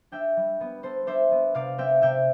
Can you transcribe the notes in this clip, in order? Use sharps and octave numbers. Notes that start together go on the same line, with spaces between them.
D4 E5 G5
G3
B3
B3 A4 C5
D4 C5 E5
B3
C3 D5 F5
C4 E5 G5
C3 E5 G5